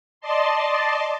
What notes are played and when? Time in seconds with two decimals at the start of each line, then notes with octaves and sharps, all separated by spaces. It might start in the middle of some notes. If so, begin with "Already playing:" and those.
0.21 D5 D#5 A5 C6